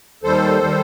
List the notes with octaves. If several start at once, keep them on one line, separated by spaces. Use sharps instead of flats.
D#2 D#3 G3 A4 C5
D#3 G3